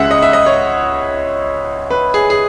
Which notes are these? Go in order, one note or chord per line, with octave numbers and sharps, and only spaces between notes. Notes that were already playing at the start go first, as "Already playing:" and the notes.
Already playing: C#2 C#3 G#3 E5 F#5
D#5
E5
D#5
C#5
B4
G#4
G#4